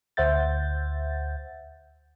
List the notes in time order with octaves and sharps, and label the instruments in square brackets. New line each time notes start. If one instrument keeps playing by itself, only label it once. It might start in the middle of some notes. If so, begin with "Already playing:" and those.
[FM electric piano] D2 C5 E5 F#5 G6 A6